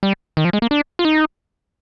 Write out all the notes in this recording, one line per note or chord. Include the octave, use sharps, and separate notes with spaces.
G3
D#3
F3
G#3
A#3
D4
F4
D#4